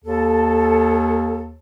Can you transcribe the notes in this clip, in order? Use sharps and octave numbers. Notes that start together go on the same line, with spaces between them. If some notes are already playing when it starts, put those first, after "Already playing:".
D#2 A4